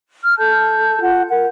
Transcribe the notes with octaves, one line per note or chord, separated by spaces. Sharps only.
F6
A4 A5 G6
F4 F#5
A#4 F#5